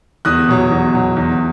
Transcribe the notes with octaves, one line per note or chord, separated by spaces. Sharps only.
E2 D#6 F#6
B2 F#3
E2
B2 F#3
E2